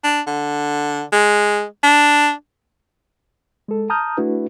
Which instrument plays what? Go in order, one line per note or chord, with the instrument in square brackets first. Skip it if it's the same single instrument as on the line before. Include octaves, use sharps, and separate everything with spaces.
[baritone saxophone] D4
D3
G#3
D4
[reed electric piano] G#3 A4
A5 A#5 D#6 F6 G6
A3 D4 E4 F#4 B4